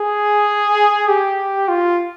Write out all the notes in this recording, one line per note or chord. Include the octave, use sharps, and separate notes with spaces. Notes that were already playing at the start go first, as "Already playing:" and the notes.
Already playing: G#4
G4
F4